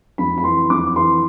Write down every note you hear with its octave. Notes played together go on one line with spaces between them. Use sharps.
F2 B5
B5
E3 C6
F2 D6
E3 C6